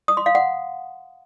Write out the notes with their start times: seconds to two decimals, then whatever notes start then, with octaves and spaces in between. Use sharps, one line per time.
0.08 D#6
0.17 C6
0.26 F5
0.35 F#5